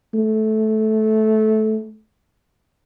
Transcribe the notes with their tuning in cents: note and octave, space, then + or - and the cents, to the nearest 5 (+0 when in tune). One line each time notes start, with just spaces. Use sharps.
A3 -15